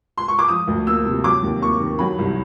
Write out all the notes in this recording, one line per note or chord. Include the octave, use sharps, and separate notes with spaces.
C6
C#6
D6
F3 D#6
D2
A#3 E6
C3
F#3 D6
D#2
A#3 C#6
D#3
F#3 B5
C2